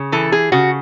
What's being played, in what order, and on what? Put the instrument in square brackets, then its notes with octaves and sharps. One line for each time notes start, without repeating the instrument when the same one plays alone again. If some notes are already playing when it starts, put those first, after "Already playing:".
Already playing: [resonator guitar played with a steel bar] C#3
E3 A4
G#4
C#3 F#4